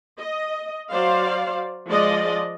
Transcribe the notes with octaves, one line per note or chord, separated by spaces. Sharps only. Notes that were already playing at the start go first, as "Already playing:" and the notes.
D#5
F#3 C5 D5 F5
F3 G#3 D5 D#5